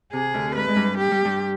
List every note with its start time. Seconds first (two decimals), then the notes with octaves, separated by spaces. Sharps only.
0.13 C3 G#4
0.34 D2 D3
0.55 G#2 G#3 B4
0.68 G#3
0.76 G2 G3
0.98 G4
1.11 G2 G3
1.25 G2 G3